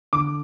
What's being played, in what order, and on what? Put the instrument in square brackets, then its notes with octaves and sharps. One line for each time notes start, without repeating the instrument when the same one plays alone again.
[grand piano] D3 D6